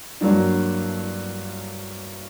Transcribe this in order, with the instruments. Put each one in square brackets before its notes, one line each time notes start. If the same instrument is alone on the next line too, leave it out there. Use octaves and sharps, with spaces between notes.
[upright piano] G2 F#3 A#3 D4